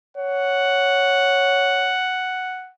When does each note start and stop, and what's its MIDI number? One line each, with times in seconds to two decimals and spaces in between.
0.17 1.94 73
0.17 2.72 78